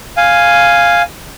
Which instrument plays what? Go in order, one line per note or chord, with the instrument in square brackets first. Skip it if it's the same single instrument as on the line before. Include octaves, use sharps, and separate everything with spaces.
[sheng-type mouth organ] F5 G#5